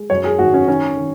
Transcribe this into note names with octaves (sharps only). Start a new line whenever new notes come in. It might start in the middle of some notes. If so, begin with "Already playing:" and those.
Already playing: G#3
F#2 C#5
G#4
G#1 F#4
C#4
D#3 C#4
D#3